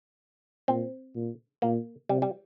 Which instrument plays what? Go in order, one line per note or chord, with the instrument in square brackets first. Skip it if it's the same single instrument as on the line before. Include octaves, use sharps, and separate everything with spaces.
[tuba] A#2 [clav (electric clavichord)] C4
[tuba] A#2
[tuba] A#2 [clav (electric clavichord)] A#3
[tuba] C3 [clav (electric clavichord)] G3
[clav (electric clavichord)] G3